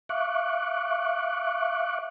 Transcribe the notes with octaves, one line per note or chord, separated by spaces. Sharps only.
E5 F5 C#6 D6 F#6